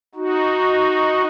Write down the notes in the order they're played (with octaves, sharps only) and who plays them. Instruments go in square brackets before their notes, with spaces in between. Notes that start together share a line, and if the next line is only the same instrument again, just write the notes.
[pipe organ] D#4 F#4